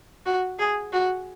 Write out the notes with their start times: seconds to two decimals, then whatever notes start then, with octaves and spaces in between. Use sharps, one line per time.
0.26 F#4
0.59 G#4
0.93 F#4